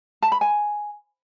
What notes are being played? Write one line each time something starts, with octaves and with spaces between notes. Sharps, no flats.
A5
B5
G#5